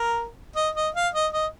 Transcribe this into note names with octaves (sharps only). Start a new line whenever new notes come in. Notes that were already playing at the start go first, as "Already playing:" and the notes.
Already playing: A#4
D#5
D#5
F5
D#5
D#5